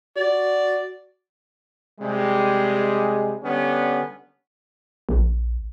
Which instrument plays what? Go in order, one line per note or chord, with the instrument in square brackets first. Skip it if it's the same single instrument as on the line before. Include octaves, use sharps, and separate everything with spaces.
[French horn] F#4 [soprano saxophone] D5
[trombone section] C3 G3 G#3
D3 G3 B3 C#4
[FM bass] A#1